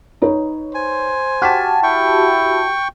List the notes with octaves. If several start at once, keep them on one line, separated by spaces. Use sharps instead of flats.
D#4 B4 C#5
C5 G#5
F#4 G4 A5 F6 B6
E4 G5 C#6